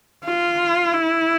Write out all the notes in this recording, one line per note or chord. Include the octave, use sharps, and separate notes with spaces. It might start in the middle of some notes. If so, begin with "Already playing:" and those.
F4
E4